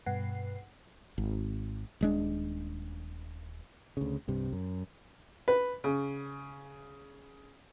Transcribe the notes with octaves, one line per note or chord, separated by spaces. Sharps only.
G2 B2 B4 F#5 C7
G#1
D#1 G#3 D4
D2 C#3
C2 G2 C3
F#2
B4
C#3